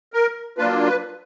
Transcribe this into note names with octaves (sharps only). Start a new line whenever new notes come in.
A#4
F#3 A#3 D4 F4 B4
B4